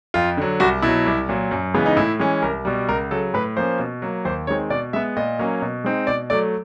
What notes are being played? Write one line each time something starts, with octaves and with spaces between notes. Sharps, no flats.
F2 F4
D3 F#3
C2 F#4
B2 F#3 E4
C2
A#2 F#3
F#2
C#3 E3 G#3 B3
D#4
A2 E4
E3 G#3 C#4
C2 A#4
B2 G3
C#2 A#4
C#3 F#3 A4
A2 B4
F3 A#3 C#4 C5
B2
F#3 A#3
D#2 C5
D#3 G#3 C4 C#5
B2 D5
G#3 B3 E5
A#2 D#5
F#3 A#3 C#4
B2
G#3 C4 D#4
B2 D5
F#3 A3 D5